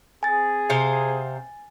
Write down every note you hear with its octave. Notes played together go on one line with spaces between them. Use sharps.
C4 G#4 G#5 A6
C3 C5 F5